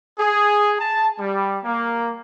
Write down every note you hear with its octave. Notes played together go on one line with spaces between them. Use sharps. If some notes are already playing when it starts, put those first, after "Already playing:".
G#4
A5
G3
A#3